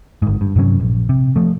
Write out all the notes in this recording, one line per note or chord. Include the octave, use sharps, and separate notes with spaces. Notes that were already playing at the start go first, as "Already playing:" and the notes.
G1 G#2
G2
G2 C3 F#3 C#4
A#1
C3
F3 A3